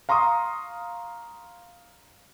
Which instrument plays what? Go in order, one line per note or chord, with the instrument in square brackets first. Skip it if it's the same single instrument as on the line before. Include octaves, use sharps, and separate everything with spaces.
[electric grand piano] F5 A#5 C6 C#6 D#6